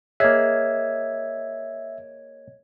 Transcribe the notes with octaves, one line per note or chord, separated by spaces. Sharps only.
A#3 G#4 C#5 D#5 E5 G#6